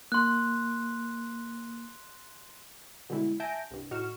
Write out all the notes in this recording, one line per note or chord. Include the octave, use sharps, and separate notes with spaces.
A#3 C6 F#6
B2 D3 G3 G#3 E4
E5 G#5 A5 G6 A#6 D7
C2 G2
A2 D#4 F#4 C#6 F6 E7